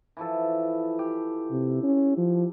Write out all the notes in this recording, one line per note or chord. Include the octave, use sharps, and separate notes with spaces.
E3 F3 A4
G4
C3
C#4
F3